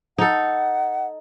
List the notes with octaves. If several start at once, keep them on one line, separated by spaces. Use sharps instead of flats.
D#4 A4 F#5